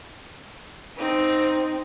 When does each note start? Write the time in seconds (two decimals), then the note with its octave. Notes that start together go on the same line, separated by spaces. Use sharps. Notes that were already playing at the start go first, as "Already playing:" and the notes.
0.96 C4 D#4